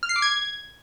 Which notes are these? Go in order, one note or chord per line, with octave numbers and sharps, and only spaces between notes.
F6
C7
D6
G#6